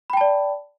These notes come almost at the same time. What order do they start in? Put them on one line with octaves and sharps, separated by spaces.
B5 G5 A5 D5